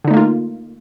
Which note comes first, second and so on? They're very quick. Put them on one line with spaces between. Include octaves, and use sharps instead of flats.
D3 D#4 A3 A#3 F4